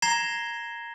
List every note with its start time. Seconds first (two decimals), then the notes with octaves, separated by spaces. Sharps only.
0.02 A#5 G#6 A#6 C7 E7 G7